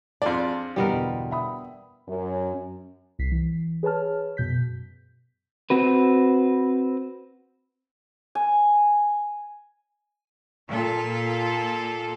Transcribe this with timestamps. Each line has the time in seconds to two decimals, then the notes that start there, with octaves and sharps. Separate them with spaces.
0.22 F2 D4 F4 G#4 D5
0.76 G1 E2 B2 G3 B3 A#4
1.31 E5 B5 D#6
2.08 F#2
3.19 C2 B6 C7
3.32 E3
3.83 G#4 B4 C#5 A5 F6
4.37 F#2 B2 G6 B6
5.70 C4 F#4 B4
8.35 G#5
10.68 A#2 F4 A4